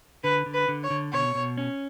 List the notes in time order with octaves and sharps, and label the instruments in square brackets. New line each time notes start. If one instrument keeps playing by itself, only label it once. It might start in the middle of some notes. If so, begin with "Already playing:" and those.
[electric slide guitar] D3 [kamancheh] B4
[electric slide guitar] D3
[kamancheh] B4
[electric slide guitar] D3
[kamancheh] C#5
[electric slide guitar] D3
[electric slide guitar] B2 [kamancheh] C#5
[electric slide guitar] B2
C#4